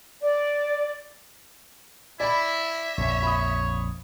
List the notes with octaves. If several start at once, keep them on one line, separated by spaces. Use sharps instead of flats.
D5
E4 D5 E5 B5
A#1 F2 C#5
B5 D#6